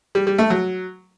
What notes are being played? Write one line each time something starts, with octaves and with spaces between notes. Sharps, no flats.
G3
G3
A3
F#3